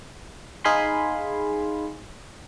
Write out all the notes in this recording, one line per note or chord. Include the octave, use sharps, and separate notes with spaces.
D#4 G#4 F5 G#5 B5 C6